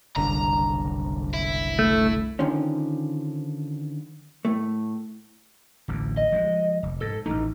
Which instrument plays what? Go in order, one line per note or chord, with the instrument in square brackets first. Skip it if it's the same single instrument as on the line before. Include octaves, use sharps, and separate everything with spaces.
[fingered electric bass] F#1 C2 D3 [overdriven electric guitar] A#5
[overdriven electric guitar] E4
[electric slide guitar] A3
[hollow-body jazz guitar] D3 D#3 F3 C#4
A2 A3
[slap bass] D1 A1 D2
[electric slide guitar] D#5
[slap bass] F3 G3 G#3
F1
[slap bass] G#2 [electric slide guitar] A4
[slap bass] A1 E3 A3 [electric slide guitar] D#4